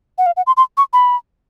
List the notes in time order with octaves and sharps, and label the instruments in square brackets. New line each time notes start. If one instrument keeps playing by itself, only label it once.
[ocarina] F#5
F5
F#5
C6
C6
C#6
B5